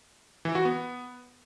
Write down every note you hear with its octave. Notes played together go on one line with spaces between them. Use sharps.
E3
F#4
B3